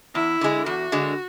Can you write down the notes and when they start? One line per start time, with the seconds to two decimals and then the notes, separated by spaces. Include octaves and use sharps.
0.15 E2 E4
0.41 D3 G#3
0.66 E2 F#4
0.92 D3 G#3